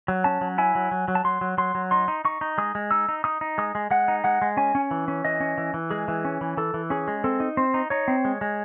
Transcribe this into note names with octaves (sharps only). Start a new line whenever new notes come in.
F#3
C#4 A5
F#3
E4 G#5
F#3
F#3
F#3
A5
F#3 C6
F#3
F#3 C6
F#3
D#4 C6
D#4
D#4 C#6
D#4
G#3 D#6
G#3
D#4 E6
D#4
D#4 D#6
D#4
G#3 D#6
G#3
G#3 F#5
D#4
G#3 F#5
G#3
C#4 G#5
C#4
E3
C#4
E3 D#5
C#4
E3
E3
G#3 G#4
E3
C#4
E3
E3 A4
E3
C#4 G#4
G#3
C4 A4
D#4
C4 C5
D#4
D#4 C#5
C4
G#3
G#3